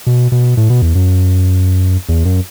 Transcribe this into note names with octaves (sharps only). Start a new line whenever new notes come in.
B2
B2
A2
B2
E2
F#2
E2
F#2